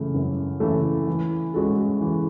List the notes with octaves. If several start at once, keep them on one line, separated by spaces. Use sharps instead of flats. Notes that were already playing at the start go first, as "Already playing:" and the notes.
Already playing: F#2 C#3 E3 A3
F#2
C#3 E3 A3
E3
G#3 C#4 F#4 A4
E3